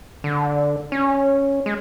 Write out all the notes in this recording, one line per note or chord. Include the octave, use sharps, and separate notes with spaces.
D3
C#4
G#3